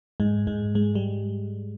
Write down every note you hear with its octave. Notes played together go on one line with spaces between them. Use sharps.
G#2 G#3
G#2 G#3
G#2 G#3
G3